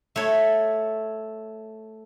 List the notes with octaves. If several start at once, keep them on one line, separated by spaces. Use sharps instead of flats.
A3 C#5